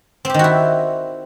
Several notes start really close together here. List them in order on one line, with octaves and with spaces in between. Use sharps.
C4 G4 D#3 F#4 E4